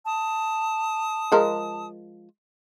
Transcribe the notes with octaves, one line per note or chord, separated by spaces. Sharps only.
A5 D#6
F3 G#3 A#4